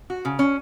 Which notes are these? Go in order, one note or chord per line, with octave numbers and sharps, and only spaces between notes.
F#4
C#3
C#4